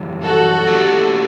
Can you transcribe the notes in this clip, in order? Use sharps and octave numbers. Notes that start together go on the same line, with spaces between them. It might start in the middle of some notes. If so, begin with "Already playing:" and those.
Already playing: F#2 E3 G3
F#4 A4
A3 E4 G4